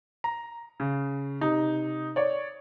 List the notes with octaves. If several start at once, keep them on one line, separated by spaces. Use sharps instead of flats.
A#5
C#3
C3 D#4
C#5 D5